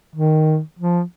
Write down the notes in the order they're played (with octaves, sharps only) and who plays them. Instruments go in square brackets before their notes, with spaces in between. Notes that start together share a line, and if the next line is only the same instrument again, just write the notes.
[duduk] D#3
F3